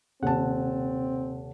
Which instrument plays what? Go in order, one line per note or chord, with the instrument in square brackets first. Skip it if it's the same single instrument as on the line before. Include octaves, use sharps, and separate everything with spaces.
[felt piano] D#1 A5 [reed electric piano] C3 F#5 [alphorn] C4